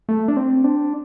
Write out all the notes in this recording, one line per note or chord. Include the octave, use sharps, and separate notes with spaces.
A3
D4
C4
D4